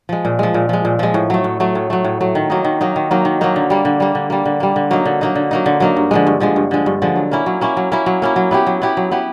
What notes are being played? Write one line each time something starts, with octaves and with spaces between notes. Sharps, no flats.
F3 G#3
A#2
F3 G#3
A#2
F3 G#3
A#2
F3 G#3
A2
F#3 A3
A2
F#3 A3
A2
F#3 A3
A2
F#3 A3
D#3
F#3 A#3 D#4
D#3
F#3 A#3 D#4
D#3
F#3 A#3 D#4
D#3
F#3 A#3 D#4
D3
G3 A#3
D3
G3 A#3
D3
G3 A#3
D3
G3 A#3
D3
F#3 A#3 D#4
D3
F#3 A#3 D#4
D3
F#3 A#3 D#4
D3
F#3 A#3 D#4
G2
D3 F3 G#3
G2
D3 F3 G#3
G2
D3 F3 G#3
G2
D3 F3 G#3
F#3
A#3 C#4 E4
F#3
A#3 C#4 E4
F#3
A#3 C#4 E4
F#3
A#3 C#4 E4
F#3
B3 E4 G4
F#3
B3 E4 G4
F#3
B3 E4 G4